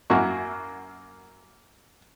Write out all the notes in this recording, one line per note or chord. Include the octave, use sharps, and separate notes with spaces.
F#2 A#3 E4 F#4 C#6